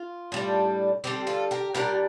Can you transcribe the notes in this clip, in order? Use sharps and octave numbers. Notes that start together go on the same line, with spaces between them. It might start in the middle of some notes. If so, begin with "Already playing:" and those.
Already playing: F4
A2 G3 D4
D3 G3 C4 G4
F4 A4
G4 A#4
A#2 G3 D4 G4 A#4